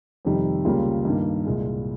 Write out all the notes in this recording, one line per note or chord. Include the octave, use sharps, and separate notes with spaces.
F2 C3 D#3 G3
C#2 C#3 G3 A#3 F4
G2 D#3 A#3
C2 A#2 G#3